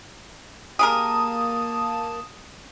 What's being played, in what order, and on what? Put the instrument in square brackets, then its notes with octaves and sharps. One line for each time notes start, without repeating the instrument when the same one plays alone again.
[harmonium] A#3 A5 [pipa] G4 G#4 A#4 [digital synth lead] D#6